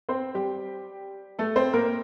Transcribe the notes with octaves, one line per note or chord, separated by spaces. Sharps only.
C4 C5
G3 G4
A3 A4
C4 C5
A#3 A#4